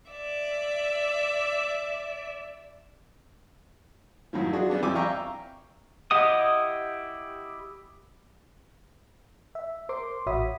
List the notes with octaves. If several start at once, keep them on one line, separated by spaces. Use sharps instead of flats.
D5 E5
F#2 A2 D#3 F3
D4 F4 F#4 G#4
G3 B3 D4
F2 C4 E4 G#5 D6
D5 E5 F5 G5 A#5 C#6
E4 G4 D#5 F#5 D#6
E5
A#4 C5 C6 D6
A1 F#4 C#5 E5 B5 D#6